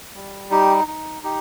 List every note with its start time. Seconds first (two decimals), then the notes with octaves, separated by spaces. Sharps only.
0.15 G3
0.51 D#4 G4
0.87 D#4
1.23 D#4 G4